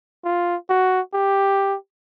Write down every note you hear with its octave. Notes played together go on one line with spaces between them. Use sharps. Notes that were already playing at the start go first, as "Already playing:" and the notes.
F4
F#4
G4